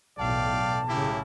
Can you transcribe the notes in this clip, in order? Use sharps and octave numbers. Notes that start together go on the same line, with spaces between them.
B1 E2 A2 D5 F5 G5 A5
A2 C#3 A#3 E4 G4